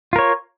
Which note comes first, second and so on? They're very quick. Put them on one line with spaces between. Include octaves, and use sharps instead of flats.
F4 A#4 C#5